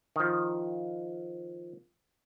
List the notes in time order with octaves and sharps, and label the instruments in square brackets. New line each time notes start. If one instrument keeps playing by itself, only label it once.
[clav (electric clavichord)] D#3 F3